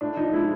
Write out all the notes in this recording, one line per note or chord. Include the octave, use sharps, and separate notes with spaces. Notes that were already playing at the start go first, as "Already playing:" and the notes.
A2 D4
F3 D#4
G#3 E4